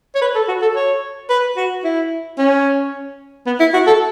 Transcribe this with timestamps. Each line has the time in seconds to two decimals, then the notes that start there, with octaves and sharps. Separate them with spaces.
0.15 C#5
0.21 B4
0.35 A4
0.48 F#4
0.62 A4
0.76 C#5
1.30 B4
1.57 F#4
1.84 E4
2.38 C#4
3.47 B3
3.60 E4
3.74 F#4
3.87 A4